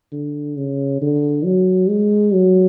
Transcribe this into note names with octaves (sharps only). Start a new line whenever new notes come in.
D3
C#3
D3
F#3
G#3
F#3